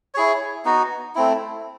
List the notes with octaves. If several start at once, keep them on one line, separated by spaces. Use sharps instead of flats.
E4 G#4 C#5
B3 D#4 F#4
A3 C4 E4